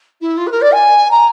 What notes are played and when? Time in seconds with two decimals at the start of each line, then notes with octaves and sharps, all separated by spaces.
0.21 E4
0.37 F4
0.46 B4
0.51 A#4
0.61 D5
0.72 G#5
1.11 A#5